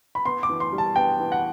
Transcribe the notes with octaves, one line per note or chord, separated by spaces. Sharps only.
B5
B3 C6
D6
E3
C6
G3
A5
B3 G5
E3
F#5